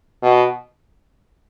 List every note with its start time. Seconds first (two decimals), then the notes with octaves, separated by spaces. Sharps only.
0.22 B2